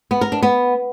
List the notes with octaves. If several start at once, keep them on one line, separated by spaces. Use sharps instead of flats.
B3
A#4
D4
B3